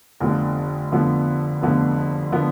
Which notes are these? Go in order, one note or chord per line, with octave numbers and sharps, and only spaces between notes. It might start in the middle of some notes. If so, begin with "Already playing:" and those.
F1 F2 D3 F3 B3
F1 F2 D3 F3 B3
F1 F2 D3 F3 B3
D3 F3 B3